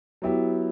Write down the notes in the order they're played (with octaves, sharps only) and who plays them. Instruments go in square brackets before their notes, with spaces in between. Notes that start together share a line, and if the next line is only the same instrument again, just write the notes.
[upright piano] F#3 B3 E4 G4